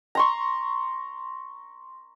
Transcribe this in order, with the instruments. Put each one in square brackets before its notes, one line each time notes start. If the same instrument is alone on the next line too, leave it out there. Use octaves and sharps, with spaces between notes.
[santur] A#5 C6 C#6